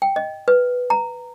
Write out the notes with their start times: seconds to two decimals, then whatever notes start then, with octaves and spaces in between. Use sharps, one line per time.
0.02 G5
0.16 D#5
0.48 B4
0.90 A#5